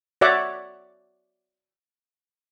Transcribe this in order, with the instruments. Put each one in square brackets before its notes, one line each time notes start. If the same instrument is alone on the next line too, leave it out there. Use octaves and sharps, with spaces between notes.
[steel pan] F#4 C#5 D5 E5 F#5 D6